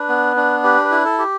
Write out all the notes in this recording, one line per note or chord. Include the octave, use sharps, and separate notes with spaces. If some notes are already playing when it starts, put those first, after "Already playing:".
Already playing: D4 B4
B3
D4
G4 B4
B4
E4
A4
G4